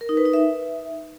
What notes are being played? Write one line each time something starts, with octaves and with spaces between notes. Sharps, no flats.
A#4
D#4
B4
D#4
E5